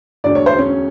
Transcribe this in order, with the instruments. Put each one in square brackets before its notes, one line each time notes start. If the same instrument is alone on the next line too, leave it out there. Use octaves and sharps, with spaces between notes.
[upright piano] E1 D2 D3 D5
C#5
C5
C#4 C#5